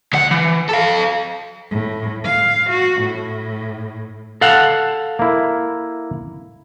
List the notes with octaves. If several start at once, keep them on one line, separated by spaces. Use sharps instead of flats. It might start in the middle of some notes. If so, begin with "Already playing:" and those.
D2 F#5
E3
A4 F5
A2
F5
F#4
A2
A4 F5 F#5
A#3 E4